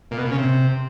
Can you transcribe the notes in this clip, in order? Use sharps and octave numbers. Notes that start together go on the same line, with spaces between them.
A#2
B2
A#2
C#3
C3